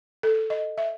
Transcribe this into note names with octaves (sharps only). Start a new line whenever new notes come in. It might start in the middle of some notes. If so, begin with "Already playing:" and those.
A4
D#5
E5